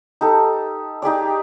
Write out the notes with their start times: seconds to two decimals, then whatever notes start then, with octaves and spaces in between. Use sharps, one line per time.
0.21 D#4 G4 A4
1.02 D#4 G4 G#4 D5